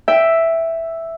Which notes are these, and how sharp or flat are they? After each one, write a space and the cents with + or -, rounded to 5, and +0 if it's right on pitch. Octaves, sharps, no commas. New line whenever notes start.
E5 +0 G5 +0